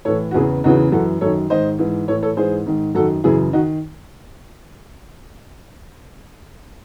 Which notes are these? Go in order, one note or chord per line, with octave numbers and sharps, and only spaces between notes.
A2 E3 A4 C#5
F#4
E2 C#3 E3 E4 G#4
E2 C#3 E3 D#4 F#4
F#2 E3 F#4 A4
F#2 D#3 A4 C#5
G#2 D#3 C5 D#5
G#2 E3
A2 E3 A4 C#5
A4 C#5
G#2 E3 G#4 C5
G#2 D#3
F#2 D#3 F#4 A4
F#2 C#3 E3 E4 G#4
D#3 D#4 F#4